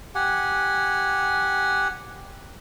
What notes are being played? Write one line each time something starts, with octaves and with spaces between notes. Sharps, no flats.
G4 F#5 G#5